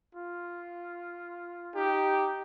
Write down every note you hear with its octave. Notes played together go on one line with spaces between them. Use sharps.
F4
D#4 G4